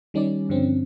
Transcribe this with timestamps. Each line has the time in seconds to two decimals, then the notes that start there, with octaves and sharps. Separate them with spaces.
0.14 D#3 G3 C#4 D#4 D5
0.49 G2 D3 F3 C4 C#4